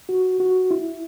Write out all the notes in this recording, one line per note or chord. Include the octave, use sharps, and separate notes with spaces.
F#4
F#4
E4